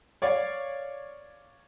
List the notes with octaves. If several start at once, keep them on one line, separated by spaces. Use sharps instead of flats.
C#5 D5 F5